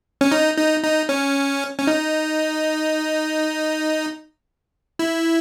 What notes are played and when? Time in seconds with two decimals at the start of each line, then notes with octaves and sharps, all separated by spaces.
0.21 C#4
0.32 D#4
0.58 D#4
0.84 D#4
1.09 C#4
1.79 C#4
1.87 D#4
4.99 E4